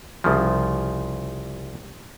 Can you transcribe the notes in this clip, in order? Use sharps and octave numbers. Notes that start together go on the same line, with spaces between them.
C2 C#3 F3